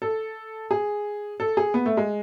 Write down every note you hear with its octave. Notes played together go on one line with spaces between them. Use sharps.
A4
G#4
A4
G#4
B3
A3
G#3